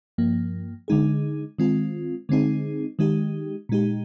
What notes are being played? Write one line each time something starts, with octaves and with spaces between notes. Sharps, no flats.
G2 F3 A#3
D3 G#3 D#4 G#4
D#3 G#3 C4 F4
D3 G#3 C4 D#4 G#4
D#3 G#3 D#4 G4
A#2 G#3 D#4 G4